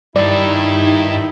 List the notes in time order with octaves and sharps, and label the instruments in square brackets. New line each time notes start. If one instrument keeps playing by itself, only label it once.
[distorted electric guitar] G2 G4 [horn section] D#3 E4 [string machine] D#4 [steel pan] D5